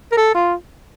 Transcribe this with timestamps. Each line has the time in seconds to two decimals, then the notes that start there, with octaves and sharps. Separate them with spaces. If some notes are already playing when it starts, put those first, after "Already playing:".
0.12 A#4
0.17 A4
0.35 F4